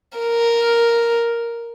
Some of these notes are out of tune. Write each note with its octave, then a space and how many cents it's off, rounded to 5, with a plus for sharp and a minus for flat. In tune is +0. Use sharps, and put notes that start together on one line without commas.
A#4 +0